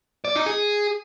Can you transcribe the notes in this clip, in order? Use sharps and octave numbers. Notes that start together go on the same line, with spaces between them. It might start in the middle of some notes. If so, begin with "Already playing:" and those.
D5
D#4
G#4